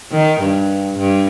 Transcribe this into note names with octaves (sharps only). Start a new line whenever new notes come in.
D#3
G2
G2